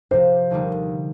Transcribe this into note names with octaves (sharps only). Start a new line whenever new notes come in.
C3 F3 C4 C5
D#2 D3 G3 A#3 D#4